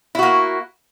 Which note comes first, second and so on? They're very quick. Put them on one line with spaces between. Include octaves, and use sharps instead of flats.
E4 F#4 A#3